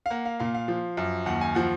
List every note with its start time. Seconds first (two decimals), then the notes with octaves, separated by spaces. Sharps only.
0.06 F5
0.10 A#3 F#5
0.25 F5
0.39 A#2 F5
0.54 F5
0.68 F3
0.97 F#2
1.26 D#2 F#5
1.41 G#5
1.55 F3 F#5